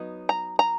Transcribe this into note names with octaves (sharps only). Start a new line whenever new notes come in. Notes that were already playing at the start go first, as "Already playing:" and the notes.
Already playing: F#3 B3 D#4
A#5
A#5